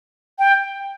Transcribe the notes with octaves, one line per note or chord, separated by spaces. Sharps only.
G5